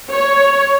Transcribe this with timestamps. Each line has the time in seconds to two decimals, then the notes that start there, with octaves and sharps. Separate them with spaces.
0.13 C#5